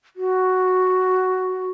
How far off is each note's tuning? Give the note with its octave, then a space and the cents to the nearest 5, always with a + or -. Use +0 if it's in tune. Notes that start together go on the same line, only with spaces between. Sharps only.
F#4 +5